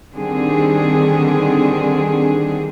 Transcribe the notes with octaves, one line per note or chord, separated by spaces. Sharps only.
D3 D#3 G3 C4 D4 G#4